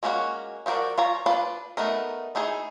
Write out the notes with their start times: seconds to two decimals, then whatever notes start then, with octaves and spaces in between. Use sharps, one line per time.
0.03 G#3 A#3 C#4 D4 F#4
0.66 F3 D#4 F#4 A#4 D5
0.98 F4 C#5 A#5
1.26 D4 F4 B4 D5
1.77 A3 B3 D#4 A#4
2.35 A3 D#4 E4 G#4